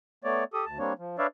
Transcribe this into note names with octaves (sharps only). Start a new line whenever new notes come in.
A3 B3 C#5 D5
G4 A4 D#6
D2 A5
G3 A#3 C4 D4 C#5
F3
D4 B4 C#5 D5 E5 F5